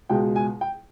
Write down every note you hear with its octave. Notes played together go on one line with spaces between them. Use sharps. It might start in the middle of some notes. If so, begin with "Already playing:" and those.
C#2 B2 G#3 G5
G#5
G5